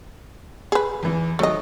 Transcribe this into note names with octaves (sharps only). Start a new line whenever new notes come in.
G#4 B4
E2 E3
G#1 F#3 A3 D#5